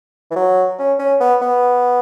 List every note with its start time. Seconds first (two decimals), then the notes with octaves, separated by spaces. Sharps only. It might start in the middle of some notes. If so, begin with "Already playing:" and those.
0.31 E3
0.36 F#3
0.79 C#4
0.99 C#4
1.21 B3
1.41 B3